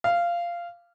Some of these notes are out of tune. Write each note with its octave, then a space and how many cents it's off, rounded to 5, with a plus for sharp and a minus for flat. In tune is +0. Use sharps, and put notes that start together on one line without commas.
F5 -15